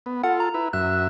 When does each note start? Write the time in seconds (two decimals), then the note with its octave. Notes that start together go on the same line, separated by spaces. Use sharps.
0.06 B3
0.23 F4 A4 F#5
0.40 A#5
0.54 E4 B4
0.73 F#2 E5 F#6